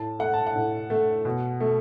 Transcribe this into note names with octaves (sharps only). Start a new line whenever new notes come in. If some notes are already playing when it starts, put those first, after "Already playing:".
Already playing: A2 A5
A3 F#5
A5
F#5
A2
A3
B2
A3